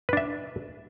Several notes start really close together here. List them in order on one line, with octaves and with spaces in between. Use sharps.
B4 D4 E5